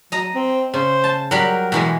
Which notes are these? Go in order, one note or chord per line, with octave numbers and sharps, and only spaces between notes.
F#3 D#5 A#5
C4
C#3 C5
A5
F#3 G3 A#4 G5
B2 E3 G#3